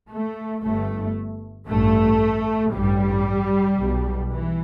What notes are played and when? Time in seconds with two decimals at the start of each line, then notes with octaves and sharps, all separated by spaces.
0.09 A3
0.61 G1 G2 A3
1.67 A1 G2 A3
2.73 A1 G2 G3
3.79 B1 B2
4.31 E3